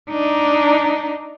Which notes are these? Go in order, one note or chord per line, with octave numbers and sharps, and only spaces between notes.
D4 D#4